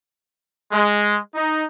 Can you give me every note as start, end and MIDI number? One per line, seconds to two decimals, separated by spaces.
0.72 1.19 56
1.35 1.65 63